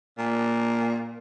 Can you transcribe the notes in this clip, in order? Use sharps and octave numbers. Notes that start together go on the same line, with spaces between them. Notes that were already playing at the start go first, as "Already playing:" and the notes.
A#2